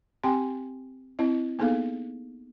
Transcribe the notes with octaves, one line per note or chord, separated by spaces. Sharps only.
C4 G4 G5 G#5 C6
C4 E4 D#5
A#3 B3 D#4 G#4 A4 F5